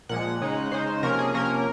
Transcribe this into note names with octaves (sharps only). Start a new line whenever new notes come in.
A#2 F3 G#3 F#5
C#3 G#3 D#4
C#3 G#3 D#4 C5
C3 F3 A#3 C#4 A#4
G#4
C3 F3 A#3 C#4 A#4